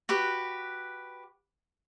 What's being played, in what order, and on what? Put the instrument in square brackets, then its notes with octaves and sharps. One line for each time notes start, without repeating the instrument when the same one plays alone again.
[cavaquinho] F#4 G4 B4